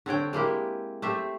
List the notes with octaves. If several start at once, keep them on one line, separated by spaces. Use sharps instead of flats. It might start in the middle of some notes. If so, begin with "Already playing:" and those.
D3 C4 C#5 G5
G#3 A#3 E4 G4
A3 G4 C5 E5